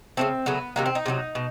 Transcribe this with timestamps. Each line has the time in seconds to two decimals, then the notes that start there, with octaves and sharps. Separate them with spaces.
0.17 C#3 F#3 A3 C4
0.46 C#3 F#3 A3 B3
0.76 C3 D#3 F#3 A#3
0.86 C4
0.95 D#4
1.06 C3 D#3 F#3
1.35 B2